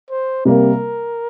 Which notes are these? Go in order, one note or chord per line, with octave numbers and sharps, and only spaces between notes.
C5
C3 G3 A#3 A#4